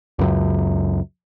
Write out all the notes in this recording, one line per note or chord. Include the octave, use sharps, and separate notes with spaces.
C#2 F#2